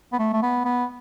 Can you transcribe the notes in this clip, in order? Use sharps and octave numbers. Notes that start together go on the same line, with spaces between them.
B3
A3
A3
B3
B3